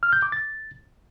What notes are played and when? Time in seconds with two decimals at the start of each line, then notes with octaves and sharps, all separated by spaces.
0.03 F6
0.13 G6
0.22 D6
0.32 A6